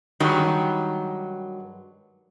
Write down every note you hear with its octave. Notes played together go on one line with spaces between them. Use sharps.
G2 D#3 F#3 G#3 G4